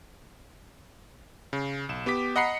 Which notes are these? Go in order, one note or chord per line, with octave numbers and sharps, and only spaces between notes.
C#3
B1 E7
B3 G4 G5 D6 B6
D#5 F#5 A#5 B5 C7 C#7